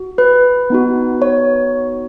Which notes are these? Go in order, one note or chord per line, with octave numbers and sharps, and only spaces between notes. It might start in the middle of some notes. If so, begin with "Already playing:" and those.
Already playing: F#4
B4
B3 D#4 F#4
C#5